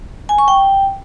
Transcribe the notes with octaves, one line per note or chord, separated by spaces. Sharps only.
G#5
C#6
G5